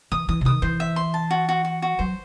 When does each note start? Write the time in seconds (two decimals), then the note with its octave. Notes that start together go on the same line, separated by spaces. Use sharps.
0.12 E3 D#6
0.29 E3 D#6
0.41 C3
0.45 D#3 D#6
0.62 E3 C5
0.80 E5
0.96 C6
1.14 A5
1.31 F#4
1.49 F#4
1.65 F#4
1.82 F#4
1.99 F#3 C5